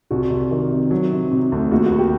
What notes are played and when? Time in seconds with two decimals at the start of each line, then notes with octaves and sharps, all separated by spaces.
0.11 C2 F#4
0.30 C2
0.51 D#3
0.71 C3
0.91 F#3
1.12 C3
1.31 C3
1.52 D2
1.71 D#2 F#4
1.86 F#4
1.92 D#2
1.99 G4